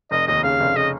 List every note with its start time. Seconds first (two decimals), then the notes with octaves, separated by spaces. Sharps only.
0.11 F1 D#5
0.27 D#2 D#5
0.43 C#3 F5
0.60 F1
0.76 C#3 D#5